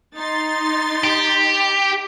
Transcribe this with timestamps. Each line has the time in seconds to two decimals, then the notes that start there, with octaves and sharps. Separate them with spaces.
0.17 D#4 C6 A6
1.04 G4